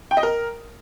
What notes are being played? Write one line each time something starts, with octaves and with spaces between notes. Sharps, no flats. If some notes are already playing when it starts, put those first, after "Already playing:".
G5
D#5
A#4